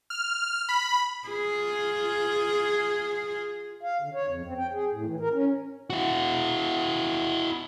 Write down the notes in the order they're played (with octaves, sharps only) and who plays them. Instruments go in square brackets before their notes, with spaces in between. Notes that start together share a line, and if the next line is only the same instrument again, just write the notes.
[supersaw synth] F6
B5
[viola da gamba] F4 G#4
[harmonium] F5
D3
C#5
F2
C4
G5
G#4
A2
E3
A#4
C#4
[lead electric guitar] E4 F#4